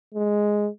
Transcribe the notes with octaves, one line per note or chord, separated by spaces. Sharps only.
G#3